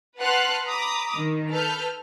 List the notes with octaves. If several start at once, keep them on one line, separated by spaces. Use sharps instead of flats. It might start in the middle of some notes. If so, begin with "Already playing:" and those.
B4 F#5 A5 C6 F6 F#6
A#5 B5 D6 D#6
D#3
A4 B4 F6 G6